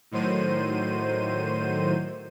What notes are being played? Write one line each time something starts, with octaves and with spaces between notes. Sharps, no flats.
A2 D#3 F#3 C5 D#7